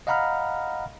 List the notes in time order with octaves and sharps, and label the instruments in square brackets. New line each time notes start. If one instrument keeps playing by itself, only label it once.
[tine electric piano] D#5 F5 F#5 A#5 B5 F6